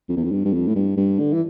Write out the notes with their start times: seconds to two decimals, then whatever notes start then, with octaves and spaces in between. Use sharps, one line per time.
0.09 F2
0.17 E2
0.24 F2
0.32 G2
0.45 G2
0.53 F2
0.67 A2
0.75 G2
0.97 G2
1.19 D3
1.33 E3